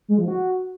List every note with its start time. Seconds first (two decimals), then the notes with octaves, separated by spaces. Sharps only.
0.08 G#3
0.18 F3
0.28 F#4